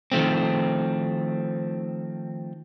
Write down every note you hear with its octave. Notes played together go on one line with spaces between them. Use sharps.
D#3 F3 A3 C4